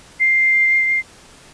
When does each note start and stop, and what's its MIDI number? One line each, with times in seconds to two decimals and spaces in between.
0.20 1.00 96